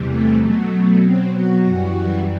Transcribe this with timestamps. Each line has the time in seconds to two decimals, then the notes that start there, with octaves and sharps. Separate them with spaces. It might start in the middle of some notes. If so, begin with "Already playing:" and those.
Already playing: E2 C3 E3 G3
0.08 A3
0.40 B2 F#3 A3
1.03 C4
1.34 F#4
1.64 F#2 E3 G3